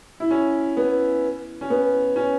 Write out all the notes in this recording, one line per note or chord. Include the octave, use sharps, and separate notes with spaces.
E4
C#4
B3
C#4
B3
C#4